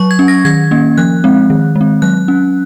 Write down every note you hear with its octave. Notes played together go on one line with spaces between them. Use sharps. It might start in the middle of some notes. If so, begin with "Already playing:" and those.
Already playing: F#3 C#6
G#6
C#4
A#6
D#3 G#6
A#3 C#4
F3 F#6
G#3 C4
D#3
G#3
C4
F#3 F#6
C#4